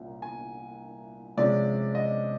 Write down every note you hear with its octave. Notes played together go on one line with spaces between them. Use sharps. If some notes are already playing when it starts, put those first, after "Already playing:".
Already playing: C2 A#2 A#3 C#4
G#5
C3 F3 G#3 C#4 D5
D#5